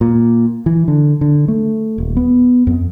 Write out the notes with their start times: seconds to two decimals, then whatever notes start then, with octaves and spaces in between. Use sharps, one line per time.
0.01 A#2
0.66 E3
0.88 D3
1.21 D3
1.48 A3
1.98 D#1
2.17 B3
2.67 F2